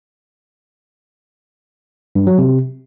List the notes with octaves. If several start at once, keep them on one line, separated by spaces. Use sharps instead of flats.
G2
F#3
C3